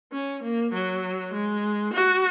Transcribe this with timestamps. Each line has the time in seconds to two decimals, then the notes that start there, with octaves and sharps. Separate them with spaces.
0.12 C#4
0.43 A#3
0.73 F#3
1.33 G#3
1.93 F#4